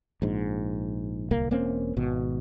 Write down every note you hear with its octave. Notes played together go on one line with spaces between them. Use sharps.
A#1 G#2
D1 C2 A#3
E1 A#3 C4 C#4
G#1 B2